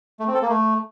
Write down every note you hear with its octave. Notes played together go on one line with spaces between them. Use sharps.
A3
C4
A4
A#3
A3